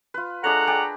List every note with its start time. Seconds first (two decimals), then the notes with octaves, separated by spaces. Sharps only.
0.14 F4 B4
0.44 G#3 D4 A4 C#5 F#5 A#5
0.67 G#4 D5 G5